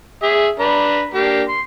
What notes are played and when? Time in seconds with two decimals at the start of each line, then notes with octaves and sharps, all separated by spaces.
0.23 G#4 E5
0.59 D4 B4 A#5
1.14 A#3 D4 G4
1.48 C6